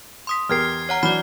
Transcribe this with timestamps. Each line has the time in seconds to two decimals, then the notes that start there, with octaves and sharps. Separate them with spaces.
0.27 C6 D#6 B6
0.49 E2 G4 A#4 F6 G#6 C7
0.89 C#5 F#5 A#5
1.03 E3 F#3 D4 D5 B5 F6 G7